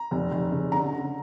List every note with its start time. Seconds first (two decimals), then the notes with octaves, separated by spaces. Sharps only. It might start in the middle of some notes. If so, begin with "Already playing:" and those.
Already playing: A#5
0.11 F1
0.31 F1
0.51 C#3
0.72 D3 A#5
0.92 D3